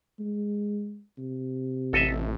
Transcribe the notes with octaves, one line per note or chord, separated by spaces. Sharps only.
G#3
C3
A1 A4 D#5 E5